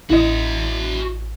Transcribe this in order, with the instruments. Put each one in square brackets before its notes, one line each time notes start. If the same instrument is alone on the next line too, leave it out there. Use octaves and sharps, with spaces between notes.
[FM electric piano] A1 [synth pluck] E4 D#5 [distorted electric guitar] F#4 E5